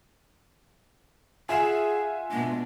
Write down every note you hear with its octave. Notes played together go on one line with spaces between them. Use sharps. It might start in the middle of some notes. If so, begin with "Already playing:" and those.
F4 G#4 E5 F#5 G#5 E7
B2 G#3 D4